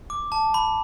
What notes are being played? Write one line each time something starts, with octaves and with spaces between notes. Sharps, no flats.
D6
A5
B5